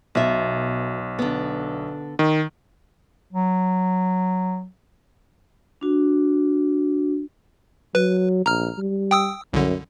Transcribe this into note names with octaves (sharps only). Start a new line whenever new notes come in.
B1 B2 E5
D3 B3
D#3
F#3
D4 F#4
F#3 B4
A#1 A#5 F6
G3
G5 D#6 E6
C2 F#2 D3